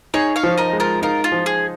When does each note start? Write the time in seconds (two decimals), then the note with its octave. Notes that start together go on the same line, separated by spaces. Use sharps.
0.14 D#4 G#4 C#5
0.36 C#5 F5
0.43 F3
0.58 A#4 D#5
0.73 G#3
0.80 F4 A#4
1.02 D#4 F4 A#4
1.24 F4
1.32 F3
1.46 G#4